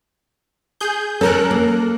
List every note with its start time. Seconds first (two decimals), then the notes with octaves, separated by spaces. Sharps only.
0.81 G#4 G6
1.21 C#4 A4 A#4 F#6
1.51 A#3